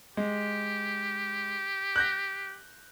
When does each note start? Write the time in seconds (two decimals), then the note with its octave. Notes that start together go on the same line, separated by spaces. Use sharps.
0.17 G#3 G4
1.96 F#6 G6 A#6